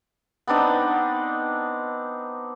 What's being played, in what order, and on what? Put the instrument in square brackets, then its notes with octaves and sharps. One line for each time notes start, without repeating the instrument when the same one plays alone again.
[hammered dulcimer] B3 C4 D4 D#4